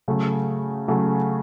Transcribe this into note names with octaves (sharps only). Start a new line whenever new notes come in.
C#3 F#3 A3
C#3 F#3 A3